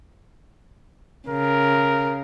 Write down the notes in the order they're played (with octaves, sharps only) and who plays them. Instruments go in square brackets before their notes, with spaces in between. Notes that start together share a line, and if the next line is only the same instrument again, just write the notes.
[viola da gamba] C#3 [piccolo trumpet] A#4